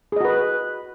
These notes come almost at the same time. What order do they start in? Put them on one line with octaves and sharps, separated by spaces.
G#4 D#5 F#4 B4